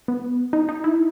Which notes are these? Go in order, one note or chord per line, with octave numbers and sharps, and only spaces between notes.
B3
D#4
D#4
E4